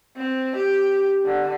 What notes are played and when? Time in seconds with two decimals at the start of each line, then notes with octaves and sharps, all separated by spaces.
0.17 C4
0.56 G4
1.25 D3